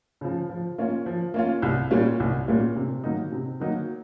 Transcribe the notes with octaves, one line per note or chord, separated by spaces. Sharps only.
C#3 F3
F3
A#3 C#4 F4
F3
A#3 C#4 F4
C2
A#2 G3 A#3 C#4
C2
A#2 G3 A#3 C#4
C3
D#3 F#3 A#3 D#4
C3
D#3 F#3 A#3 D#4